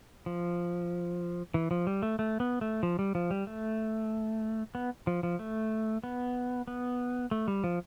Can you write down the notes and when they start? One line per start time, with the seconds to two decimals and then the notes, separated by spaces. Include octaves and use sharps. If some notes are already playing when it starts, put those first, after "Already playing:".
0.26 F3
1.54 E3
1.71 F3
1.87 G3
2.02 A3
2.19 A3
2.40 B3
2.61 A3
2.83 F3
2.99 G3
3.15 F3
3.31 G3
3.47 A3
4.75 B3
5.07 F3
5.23 F3
5.39 A3
6.04 B3
6.68 B3
7.31 A3
7.48 G3
7.64 F3